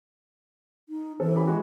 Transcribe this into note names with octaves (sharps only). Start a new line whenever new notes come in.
D#4
E3 C4 A4 C5
C#4 G4 B5
G#3 F#4